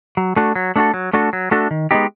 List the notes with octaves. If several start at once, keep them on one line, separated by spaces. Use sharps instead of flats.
F#3
A3 D4 F#4 A4
F#3
A3 D4 F#4 A4
F#3
A3 D4 F#4 A4
F#3
A3 D4 F#4 A4
D#3
G#3 B3 D#4 G4